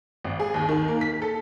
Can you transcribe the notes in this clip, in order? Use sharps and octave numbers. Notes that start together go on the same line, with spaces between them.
G#1
G#4
D#2
D#3
A#3
B6
A4